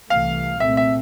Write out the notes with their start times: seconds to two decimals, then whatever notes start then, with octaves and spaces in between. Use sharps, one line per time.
0.10 C2 C3 E3 A3 F5
0.60 A#2 A3 C4 E5
0.77 E5